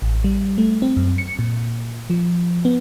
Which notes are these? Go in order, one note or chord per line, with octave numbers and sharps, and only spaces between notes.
A1
G3
A3
C4
F#2
C#7
A#2
F3
B3